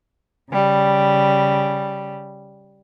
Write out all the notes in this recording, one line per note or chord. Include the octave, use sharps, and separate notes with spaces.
C#3 G3